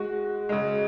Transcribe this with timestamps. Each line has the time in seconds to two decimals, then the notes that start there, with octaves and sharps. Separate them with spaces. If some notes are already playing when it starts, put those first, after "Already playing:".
Already playing: G#3 F#4
0.49 C#3 G#3